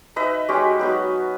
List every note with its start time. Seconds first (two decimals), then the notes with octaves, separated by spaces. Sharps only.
0.16 D#4 B4 D#5 E5
0.49 G#3 C#4 F#4 G4
0.79 F#3 B3 D#4